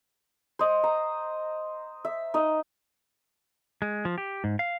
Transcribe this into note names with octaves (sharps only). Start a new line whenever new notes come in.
C5 D#5
A#5
E5
D#4 D#5
G#3
F3
G4
G#2
F5